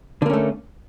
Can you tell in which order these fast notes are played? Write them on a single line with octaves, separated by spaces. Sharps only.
D3 A#3 C#4 A3